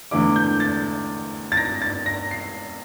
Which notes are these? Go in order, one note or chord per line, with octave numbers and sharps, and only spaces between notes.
E2 D3 A3 E4 D6
G6
A6
A6
A#6
A6
A#6
C7